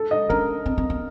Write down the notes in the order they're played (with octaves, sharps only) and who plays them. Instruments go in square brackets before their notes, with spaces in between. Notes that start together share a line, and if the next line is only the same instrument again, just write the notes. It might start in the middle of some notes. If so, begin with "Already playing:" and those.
Already playing: [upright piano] A4
D#5
[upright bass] C#4 [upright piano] A#4
[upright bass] C4
C4
B3